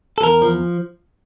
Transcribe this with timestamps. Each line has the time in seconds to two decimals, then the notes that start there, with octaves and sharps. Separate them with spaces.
0.18 A4
0.22 E2 A#4
0.42 F3